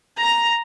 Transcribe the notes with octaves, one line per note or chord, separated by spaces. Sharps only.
A#5